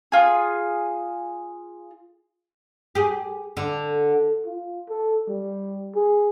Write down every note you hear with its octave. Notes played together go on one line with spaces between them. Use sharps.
F4 G#4
G4 G#4
D3
F4
A4
G3
G#4